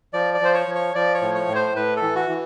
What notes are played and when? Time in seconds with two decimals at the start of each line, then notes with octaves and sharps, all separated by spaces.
0.13 F3 D5
0.34 D5
0.41 F3 C5
0.54 C#5
0.67 F3
0.75 C#5
0.95 F3 D5
1.14 C#5
1.22 A2
1.35 C#5
1.48 A2
1.55 C5
1.76 A2 B4
1.96 A4
2.02 E3
2.15 F#4
2.29 E3